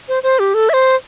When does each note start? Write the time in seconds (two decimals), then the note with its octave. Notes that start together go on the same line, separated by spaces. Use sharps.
0.08 C5
0.23 C5
0.39 G4
0.54 A4
0.69 E5
0.73 C5